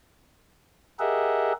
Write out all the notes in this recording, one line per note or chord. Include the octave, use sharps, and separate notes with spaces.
G4 G#4 A#4 D#5 E5 F#5